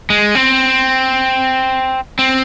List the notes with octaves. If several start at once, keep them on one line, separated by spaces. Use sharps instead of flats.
G#3
C4
C4